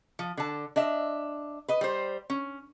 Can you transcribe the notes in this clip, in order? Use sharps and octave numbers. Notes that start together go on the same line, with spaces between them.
F3
D3 A5
D4 D#5 E5
B4 D#5
G3 C5
C#4